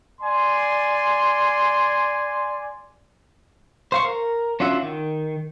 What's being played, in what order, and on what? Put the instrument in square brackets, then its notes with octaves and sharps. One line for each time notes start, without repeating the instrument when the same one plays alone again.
[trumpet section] D5 G#5 C6
[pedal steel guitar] C5 F5 C#6
A#4
C#4 D4 F4 F#4 E5
D#3